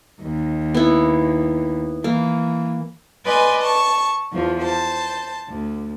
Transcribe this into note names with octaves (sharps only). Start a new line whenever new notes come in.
D#2
B3 E4
E3 A#3
B4 D5 D#5 G#5 C6
A5 C#6
E2 F3
C5 A5
D2